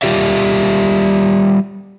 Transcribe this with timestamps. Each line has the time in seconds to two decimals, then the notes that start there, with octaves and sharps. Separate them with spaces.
0.02 G3 A3 F4 G4 D5 E5